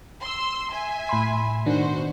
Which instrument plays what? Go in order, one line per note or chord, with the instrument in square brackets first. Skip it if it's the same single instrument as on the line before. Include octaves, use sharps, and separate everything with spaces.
[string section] C6 E6
E5 G#5
[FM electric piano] A2 B5 C6
[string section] B2 F#4 C5 [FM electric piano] D#3 D4